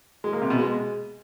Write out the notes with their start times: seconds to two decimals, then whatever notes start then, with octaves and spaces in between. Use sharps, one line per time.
0.24 G#3
0.33 A#3
0.42 C3
0.50 B2
0.59 G#3